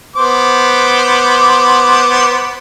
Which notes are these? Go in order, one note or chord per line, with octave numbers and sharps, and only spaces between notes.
B3 C5 D6